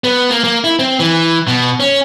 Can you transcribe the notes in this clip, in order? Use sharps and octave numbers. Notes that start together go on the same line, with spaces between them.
B3
A#3
A#3
E4
C4
E3
B2
C#4